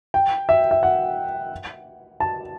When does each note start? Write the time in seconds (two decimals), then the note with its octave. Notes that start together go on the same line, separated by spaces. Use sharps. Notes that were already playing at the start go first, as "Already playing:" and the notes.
0.14 G5
0.49 E5
0.71 E5
0.83 F#5
2.20 A5